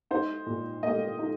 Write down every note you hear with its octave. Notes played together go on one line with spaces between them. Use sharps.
D#4 C5
A#2
A#3 D#5
D#4